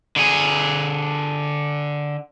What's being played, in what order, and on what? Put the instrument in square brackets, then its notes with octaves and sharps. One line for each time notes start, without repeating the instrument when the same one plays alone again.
[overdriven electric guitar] D3 G#4